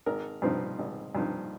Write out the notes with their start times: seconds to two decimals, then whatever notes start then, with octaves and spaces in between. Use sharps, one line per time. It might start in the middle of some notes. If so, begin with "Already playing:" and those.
0.06 G#1 A#4
0.42 G2 F3 C4 D#4
0.79 G#1
1.15 G2 F3 C4 D#4